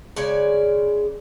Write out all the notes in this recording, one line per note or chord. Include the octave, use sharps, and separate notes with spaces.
C#3 G#3 C#5 D5